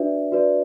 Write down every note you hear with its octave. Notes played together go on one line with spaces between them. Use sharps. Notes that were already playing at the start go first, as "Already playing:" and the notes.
Already playing: D4 F#4 B4 D5 E5
F#4 B4 D5